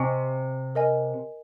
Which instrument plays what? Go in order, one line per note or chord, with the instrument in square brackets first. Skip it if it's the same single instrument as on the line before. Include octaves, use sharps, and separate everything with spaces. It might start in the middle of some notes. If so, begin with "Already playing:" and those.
Already playing: [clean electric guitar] C3 [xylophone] D#5 G#5 C#6
[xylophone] A#4 D#5 G#5